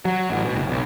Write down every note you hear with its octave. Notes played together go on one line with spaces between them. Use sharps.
F#3
A1
B2
F#1
B1